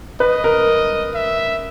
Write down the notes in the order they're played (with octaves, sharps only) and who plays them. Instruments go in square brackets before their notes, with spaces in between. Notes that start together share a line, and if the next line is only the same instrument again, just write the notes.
[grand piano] B4 [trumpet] D#5
[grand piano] A#4
[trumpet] E5